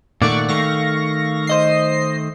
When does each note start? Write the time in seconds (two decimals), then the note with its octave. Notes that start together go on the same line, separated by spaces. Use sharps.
0.22 A#2 D#3 A3 D5 F#5 C#6
0.49 D#3 A3 F5 C#6 A#6
1.47 C5 D#5 C7